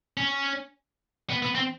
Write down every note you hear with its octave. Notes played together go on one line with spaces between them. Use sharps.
C#4
B3
B3
C4